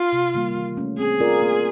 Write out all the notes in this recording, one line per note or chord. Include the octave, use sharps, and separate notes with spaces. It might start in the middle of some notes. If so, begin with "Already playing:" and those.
Already playing: F4
C3
D#3 G3 A#3
E3
A3 C#4
C4 G#4
F4 A#4 D5
A#3